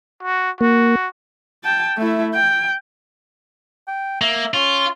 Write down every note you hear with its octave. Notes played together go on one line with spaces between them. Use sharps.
F#4
A#3 F#4
G5 A5
A3 E4
G5
G5
A#3 E5
C#4 F4